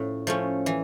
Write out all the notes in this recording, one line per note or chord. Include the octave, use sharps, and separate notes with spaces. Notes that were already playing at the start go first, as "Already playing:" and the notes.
Already playing: A2 F3 C#4
F3 A3 C#4
E3